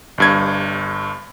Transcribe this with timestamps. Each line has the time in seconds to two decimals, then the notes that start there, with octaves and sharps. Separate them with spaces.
0.18 G1 G2 G#6